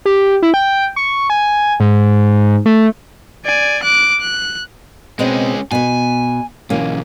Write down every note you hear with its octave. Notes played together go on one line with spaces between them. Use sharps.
G4
E4
G5
C#6
G#5
G#2
A3
D5 G#5
D6 F#6
F#6
B2 G#3 C4 C#4 D#5
B2 B3 G#5
B1 E3 A#3 C#4